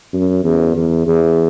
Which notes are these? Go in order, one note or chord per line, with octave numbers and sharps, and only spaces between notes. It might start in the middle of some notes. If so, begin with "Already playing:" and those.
F#2
E2
E2
E2